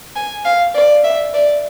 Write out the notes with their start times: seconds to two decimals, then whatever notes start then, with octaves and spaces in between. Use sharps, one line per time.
0.16 G#5
0.45 F5
0.74 D5
1.04 E5
1.34 D5